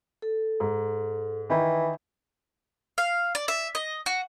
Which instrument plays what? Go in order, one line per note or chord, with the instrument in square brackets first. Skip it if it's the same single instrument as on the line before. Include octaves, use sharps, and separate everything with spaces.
[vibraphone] A4
[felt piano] G#2
[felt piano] D#3 E4 [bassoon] E3
[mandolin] F5
D5
E5
D#5
F#4